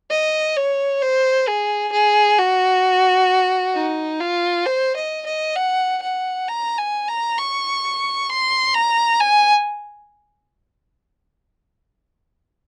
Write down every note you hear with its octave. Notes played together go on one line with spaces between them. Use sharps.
D#5
C#5
C5
G#4
G#4
F#4
D#4
F4
C5
D#5
D#5
F#5
F#5
A#5
G#5
A#5
C#6
C6
A#5
G#5